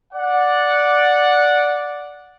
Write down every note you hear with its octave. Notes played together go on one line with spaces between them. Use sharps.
D5 F#5